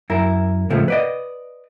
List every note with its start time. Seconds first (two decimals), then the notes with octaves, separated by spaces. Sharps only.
0.10 F#2 E4 A#4
0.70 A2 C#3 F3 G#3 A3
0.88 B4 D5 D#5